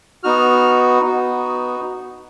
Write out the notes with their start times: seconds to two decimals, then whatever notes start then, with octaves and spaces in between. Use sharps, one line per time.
0.24 B3 D#4 F#4 F6
1.03 B3 D#4 F#4